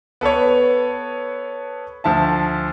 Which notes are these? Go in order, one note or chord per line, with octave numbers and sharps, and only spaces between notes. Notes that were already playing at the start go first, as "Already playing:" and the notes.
B3 A4 B4 C#5
D2 F3 E5 A5